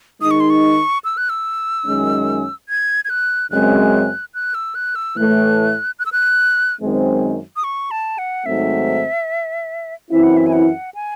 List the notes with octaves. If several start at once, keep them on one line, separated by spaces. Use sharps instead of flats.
D#3 G#3 D#4 D#6
C#6
C6
C#6
E6
F#6
E6
F#2 D#3 G#3 C#4
G#6
G#6
F#6
F#2 C#3 G#3 C4 F#6
F#6
E6
F#6
E6
A2 E3 A3 F#6
F#6
E6
F#6
F#2 D#3 G#3 C4
D#6
C#6
A5
F#5
G#2 D#3 F#3 A3 C4 E5
F#2 E3 C4 E4 E5
F#5
E5
G#5
F#5
G#5